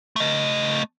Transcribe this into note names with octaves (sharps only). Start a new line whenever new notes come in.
A3 D#5